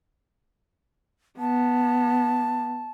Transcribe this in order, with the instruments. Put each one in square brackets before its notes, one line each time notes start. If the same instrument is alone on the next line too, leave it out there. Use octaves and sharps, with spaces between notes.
[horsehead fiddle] B3 [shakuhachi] A5